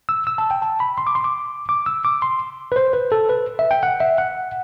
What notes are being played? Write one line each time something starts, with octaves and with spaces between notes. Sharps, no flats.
E6
E6
A5
G5
A5
B5
C6
D6
C6
D6
D6
E6
D6
C6
B4
C5
B4
A4
B4
E5
G5
F#5
E5
F#5